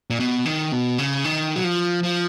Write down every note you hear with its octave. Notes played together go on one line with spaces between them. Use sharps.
A#2
B2
D#3
B2
C#3
D#3
F#3
F3
F3